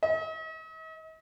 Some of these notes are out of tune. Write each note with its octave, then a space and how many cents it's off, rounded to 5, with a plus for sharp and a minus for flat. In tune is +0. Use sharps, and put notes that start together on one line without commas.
D#5 +45